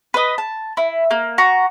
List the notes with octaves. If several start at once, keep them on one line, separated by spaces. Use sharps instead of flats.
B4 D#5
A5
E4
A#3
F#4 A#5